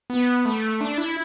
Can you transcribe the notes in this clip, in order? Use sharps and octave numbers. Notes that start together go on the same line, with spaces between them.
B3
A3
D4
E4